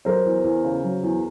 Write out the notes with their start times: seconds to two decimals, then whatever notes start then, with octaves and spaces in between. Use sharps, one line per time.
0.05 F#3 A#4 C5
0.25 E2
0.44 E2
0.64 C#3
0.84 F#3
1.03 E2